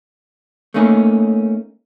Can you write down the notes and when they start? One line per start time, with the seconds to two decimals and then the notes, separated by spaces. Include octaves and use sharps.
0.74 A3 A#3 C#4 D#4